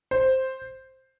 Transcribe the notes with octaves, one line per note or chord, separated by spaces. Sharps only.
C5